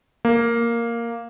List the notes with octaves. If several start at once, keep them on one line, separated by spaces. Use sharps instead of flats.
A#3